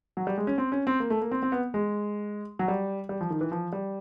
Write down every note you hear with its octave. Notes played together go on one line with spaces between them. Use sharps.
F#3
G3
G#3
C#4
C4
C#4
C4
A#3
A3
A#3
C4
C4
B3
G#3
F#3
G3
G3
F3
D#3
E3
F3
G3